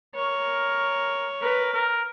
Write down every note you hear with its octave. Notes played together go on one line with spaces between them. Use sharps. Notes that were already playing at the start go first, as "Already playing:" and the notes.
A#4 C#5
A#4 B4
A#4